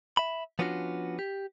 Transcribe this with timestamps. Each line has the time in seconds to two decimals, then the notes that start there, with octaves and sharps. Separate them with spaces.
0.17 E5 B5
0.59 F3 B3 C#4 D4 F4 F#4
1.19 G4